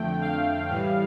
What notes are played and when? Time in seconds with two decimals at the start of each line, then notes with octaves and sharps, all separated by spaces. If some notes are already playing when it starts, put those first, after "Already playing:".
Already playing: F2 D3 A3 G5
0.21 F5
0.69 A2 E3 G3